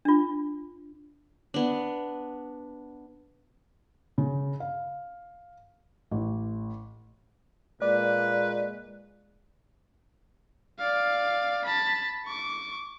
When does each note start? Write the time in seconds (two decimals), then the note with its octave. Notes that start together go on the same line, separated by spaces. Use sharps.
0.05 D4 F4
1.54 B3 D4
4.18 C#3
4.60 F5
6.11 A1
7.82 A#2 G#3 B4 D5
10.79 D5 F5
11.65 A5 B5
12.25 C#6 D6